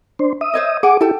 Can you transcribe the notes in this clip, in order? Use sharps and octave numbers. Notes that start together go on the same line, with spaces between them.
D4 C5
E5 D#6
C5 C#5 D#5
G#4 F#5 G#5 D6
E4 G4 A4 G5 A5